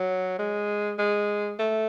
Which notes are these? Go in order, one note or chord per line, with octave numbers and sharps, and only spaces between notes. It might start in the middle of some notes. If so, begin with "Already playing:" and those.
Already playing: F#3
G#3
G#3
A3